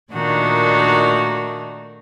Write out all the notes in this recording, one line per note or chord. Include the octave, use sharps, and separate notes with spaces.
A#2 D#3 A3 D4 D#4 F#4